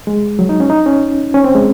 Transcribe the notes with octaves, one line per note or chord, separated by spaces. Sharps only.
G#3
F#3
D#4
C#4
D#4
C#4
C#4
C4
G#3